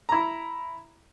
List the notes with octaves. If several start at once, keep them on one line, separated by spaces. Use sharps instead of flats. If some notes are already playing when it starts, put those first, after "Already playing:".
E4 A#5